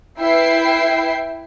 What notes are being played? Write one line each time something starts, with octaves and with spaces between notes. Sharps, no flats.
E4 B4 E5 G5 C7